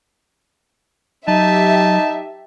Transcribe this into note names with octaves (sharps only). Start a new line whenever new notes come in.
F#3 D#4 G4 E5 A5